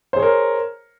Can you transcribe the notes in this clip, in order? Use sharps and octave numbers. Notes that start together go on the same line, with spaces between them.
G#4 A#4 C5 C#5